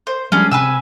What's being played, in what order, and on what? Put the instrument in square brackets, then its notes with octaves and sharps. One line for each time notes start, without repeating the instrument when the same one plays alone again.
[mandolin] C5
[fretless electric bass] F3 G3 G#3 [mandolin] C#4 D4 G#4
[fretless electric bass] C3 [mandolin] B4 G#5 E6